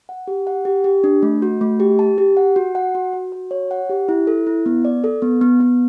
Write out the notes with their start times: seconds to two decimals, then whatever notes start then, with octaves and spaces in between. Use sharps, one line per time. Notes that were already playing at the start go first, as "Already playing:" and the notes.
0.09 F#5
0.27 G4
0.47 F#5
0.65 G4
0.84 G4
1.04 D4
1.23 A3
1.42 F#4
1.61 A3
1.80 G4
1.99 A5
2.18 G4
2.37 F#5
2.56 F#4
2.75 F#5
2.95 F#4
3.13 F#4
3.32 F#4
3.51 C#5
3.71 F#5
3.89 G4
4.09 E4
4.27 A4
4.47 E4
4.66 B3
4.85 D5
5.04 A4
5.22 B3
5.41 B3
5.60 B3